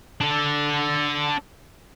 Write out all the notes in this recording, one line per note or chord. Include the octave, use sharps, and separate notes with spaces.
D4 A4